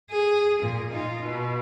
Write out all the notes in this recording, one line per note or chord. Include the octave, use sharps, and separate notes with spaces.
G#4
A#2
D#4 F4
B2